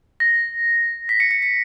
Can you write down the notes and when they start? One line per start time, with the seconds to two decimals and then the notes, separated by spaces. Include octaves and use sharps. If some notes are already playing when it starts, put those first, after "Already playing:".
0.20 A#6
1.09 B6
1.20 C#7
1.31 C#7
1.42 C#7